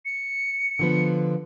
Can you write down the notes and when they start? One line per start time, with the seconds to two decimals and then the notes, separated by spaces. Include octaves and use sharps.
0.05 C#7
0.79 D3 F3 B3